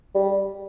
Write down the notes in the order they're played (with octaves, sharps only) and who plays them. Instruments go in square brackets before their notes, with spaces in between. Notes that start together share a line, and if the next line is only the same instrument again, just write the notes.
[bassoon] G3